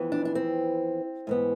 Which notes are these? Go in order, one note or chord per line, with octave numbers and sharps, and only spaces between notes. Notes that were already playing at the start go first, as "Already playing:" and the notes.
Already playing: F2 E3 B3
D4
D4
C4
G#2 E3 B3